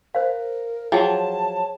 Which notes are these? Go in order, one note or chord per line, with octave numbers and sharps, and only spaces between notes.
A#4 C5 F5
F3 F#3 G#4 C#5 G5 A5 A#5